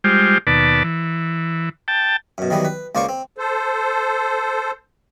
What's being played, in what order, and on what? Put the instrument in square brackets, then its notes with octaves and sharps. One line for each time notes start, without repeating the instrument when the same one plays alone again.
[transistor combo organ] G3 G#3 F4 G4 C5
D#2 B2 B4 D5 A5
E3
G5 A5
[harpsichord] F#2 B2
D#3 E3 F#3 G3 B3
B4
C#2 A#3 C5 D5 F5 C#6
C4
[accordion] A4 C5